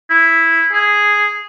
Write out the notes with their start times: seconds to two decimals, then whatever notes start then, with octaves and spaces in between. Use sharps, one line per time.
0.10 E4
0.73 G#4